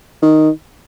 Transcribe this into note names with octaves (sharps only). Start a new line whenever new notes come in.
D#3